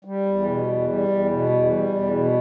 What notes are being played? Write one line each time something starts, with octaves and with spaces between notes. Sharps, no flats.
G3
E2
B2
E2
G3
E2
B2
E2
G3
E2
B2